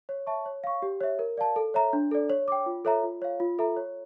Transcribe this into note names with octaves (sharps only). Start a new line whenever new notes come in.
C#5
E5 A5 C#6
C#5
F5 C#6
G4
C#5 E5
A#4
D5 F5 A5
A4
C#5 E5 A#5
D4
A4 D5
C#5
G5 D6
F4
A4 C#5 E5 A#5
F4
C#5 F5
F4
A4 E5 A#5
C#5